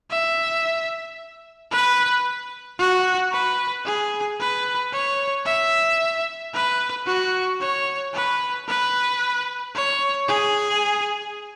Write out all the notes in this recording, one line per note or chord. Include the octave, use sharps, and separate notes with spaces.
E5
B4
F#4
B4
G#4
B4
C#5
E5
B4
F#4
C#5
B4
B4
C#5
G#4